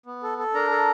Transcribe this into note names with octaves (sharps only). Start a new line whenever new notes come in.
B3
A4
A4
D4 A#4 A#5
A4